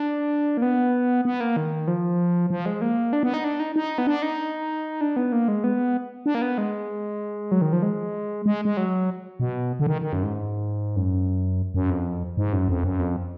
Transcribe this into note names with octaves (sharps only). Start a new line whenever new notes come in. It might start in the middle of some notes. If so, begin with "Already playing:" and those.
Already playing: D4
A#3
B3
B3
A#3
D#3
F3
F3
G#3
A#3
D4
B3
D#4
D4
D#4
D#4
B3
D4
D#4
D4
B3
A#3
G#3
B3
D4
A#3
B3
G#3
F#3
D#3
F3
G#3
G#3
G#3
F#3
B2
D3
D#3
D#3
F#2
G#2
F#2
F#2
F2
G#2
F#2
F2
F#2
F2